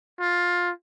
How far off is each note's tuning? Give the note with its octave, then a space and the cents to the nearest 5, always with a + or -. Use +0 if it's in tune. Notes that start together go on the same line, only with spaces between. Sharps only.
F4 +15